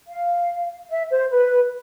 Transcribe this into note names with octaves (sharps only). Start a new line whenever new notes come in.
F5
E5
C5
B4